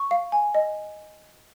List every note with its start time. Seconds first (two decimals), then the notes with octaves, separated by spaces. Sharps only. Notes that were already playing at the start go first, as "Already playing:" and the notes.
Already playing: C#6
0.11 F5
0.32 G#5
0.55 D#5